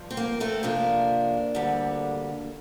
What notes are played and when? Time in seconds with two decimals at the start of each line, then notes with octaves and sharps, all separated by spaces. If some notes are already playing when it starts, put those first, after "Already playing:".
Already playing: G2 F3
0.11 C4
0.17 A#3
0.40 A3 C4
0.63 F2 C3 F3 A#3 D4
1.55 D2 D3 G3